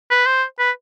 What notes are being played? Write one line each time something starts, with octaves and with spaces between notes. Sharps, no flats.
B4
C5
B4